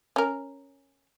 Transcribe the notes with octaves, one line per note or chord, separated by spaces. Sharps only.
C#4 A#4